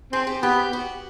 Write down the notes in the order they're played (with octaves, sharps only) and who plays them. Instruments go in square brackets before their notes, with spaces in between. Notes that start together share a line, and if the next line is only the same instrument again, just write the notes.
[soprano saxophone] C4 [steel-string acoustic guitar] G#4
[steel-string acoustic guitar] G4
[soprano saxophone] B3 [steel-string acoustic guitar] G4
[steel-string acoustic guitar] F#4